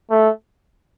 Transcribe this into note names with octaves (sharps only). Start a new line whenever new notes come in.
A3